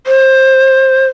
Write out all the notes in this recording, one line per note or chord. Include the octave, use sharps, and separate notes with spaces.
C5